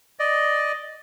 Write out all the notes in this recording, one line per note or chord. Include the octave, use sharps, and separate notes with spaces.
D5 D#5